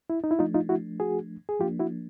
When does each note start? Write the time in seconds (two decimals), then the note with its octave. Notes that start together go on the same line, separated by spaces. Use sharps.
0.10 E4
0.24 D#4
0.31 E4
0.39 F3 A3 D4 D#4 F4
0.54 D#4 F4
0.69 E4 F#4
1.00 F#4 G#4
1.49 G#4
1.60 F3 A#3 D4 F4 G4
1.80 E4 F#4